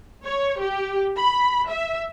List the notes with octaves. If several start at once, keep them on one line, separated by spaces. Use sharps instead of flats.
C#5
G4
B5
E5